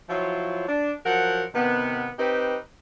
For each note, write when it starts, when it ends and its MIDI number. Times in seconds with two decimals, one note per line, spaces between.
0.10 0.67 53
0.10 0.67 54
0.10 0.67 64
0.10 0.67 65
0.10 0.67 73
0.68 0.92 62
1.06 1.44 53
1.06 1.44 54
1.06 1.44 70
1.06 1.44 78
1.55 2.10 48
1.55 2.10 51
1.55 2.10 59
2.19 2.57 60
2.19 2.57 63
2.19 2.57 67
2.19 2.57 71